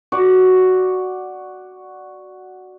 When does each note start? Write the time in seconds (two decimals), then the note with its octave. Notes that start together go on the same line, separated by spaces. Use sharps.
0.12 F#4 D5